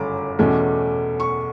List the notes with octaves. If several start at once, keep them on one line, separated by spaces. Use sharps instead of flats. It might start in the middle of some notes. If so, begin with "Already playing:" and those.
Already playing: G1 F#2 C#3 A3 D6
E2 B2 A3 C#4
C#6